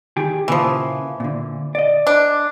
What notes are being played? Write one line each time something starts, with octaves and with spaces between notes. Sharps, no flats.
D#3 G4 G#4
A#2 C#3 E3 F3
A#2 D3
D5 D#5
D4